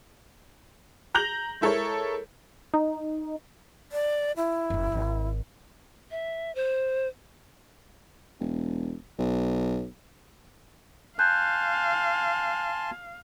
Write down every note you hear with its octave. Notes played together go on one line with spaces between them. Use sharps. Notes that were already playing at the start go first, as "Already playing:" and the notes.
A#5 G6 A#6 F7 F#7
G#3 E4 A4 A#4 C#5
D#4
D5
E4
F#1 E2
G#1
E5
C5
E1
B1
F5 G#5 A5 C6 F#6 G6